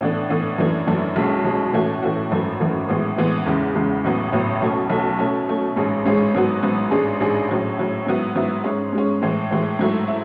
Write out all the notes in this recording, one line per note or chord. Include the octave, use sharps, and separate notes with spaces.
A2 E3 B3 D4 A4
A2 E3 B3 D4 A4
F#2 E3 A3 D4
F#2 E3 A3 D4
B1 B2 G#3 C#4
B1 B2 G#3 C#4
A2 E3 A3 C#4 F#4
A2 E3 A3 C#4 F#4
G#1 F#2 E3 A3
G#1 F#2 E3 A3
A2 E3 G#3 B3
A2 E3 G#3 B3
E2 C#3 G#3
E2 C#3 G#3
A1 A2 F#3 B3
A1 A2 F#3 B3
B1 B2 A3 C#4
B1 B2 A3 C#4
B2 A3 C#4
B2 A3 C#4
A1 G#2 G#3 C#4 G#4
A1 G#2 G#3 C#4 G#4
A1 G#2 F#3 B3 F#4
A1 G#2 F#3 B3 F#4
A1 G#2 G#3 D4 G#4
A1 G#2 G#3 D4 G#4
A2 F#3 C#4
A2 F#3 C#4
G#2 F#3 B3 E4
G#2 F#3 B3 E4
G#2 G#3 C#4
G#2 G#3 C#4
A2 E3 G#3
A2 E3 G#3
G#2 F#3 A3 E4
E4